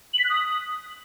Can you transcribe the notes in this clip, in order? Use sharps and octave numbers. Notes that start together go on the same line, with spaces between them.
F#7
B6
F#6
D#6